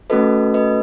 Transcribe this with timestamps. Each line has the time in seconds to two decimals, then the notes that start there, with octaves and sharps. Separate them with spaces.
0.10 A3 C#4 F#4 A4 B4 D#5
0.54 B4 D#5